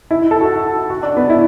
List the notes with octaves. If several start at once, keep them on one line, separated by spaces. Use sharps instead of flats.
E4
A4
F#4
F#4
D4
B3
E4